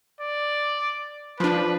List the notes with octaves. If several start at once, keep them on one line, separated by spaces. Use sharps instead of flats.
D5
F3 D4 B4